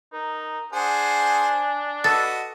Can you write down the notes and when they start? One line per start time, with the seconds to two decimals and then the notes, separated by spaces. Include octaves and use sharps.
0.13 D#4 A#4
0.73 D4 G#4 C5 F#5 G#5
2.04 F#4 A4 B4 D#5